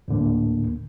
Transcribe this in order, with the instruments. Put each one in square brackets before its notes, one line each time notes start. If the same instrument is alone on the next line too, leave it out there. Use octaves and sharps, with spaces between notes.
[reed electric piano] D2 A2 D3 A#3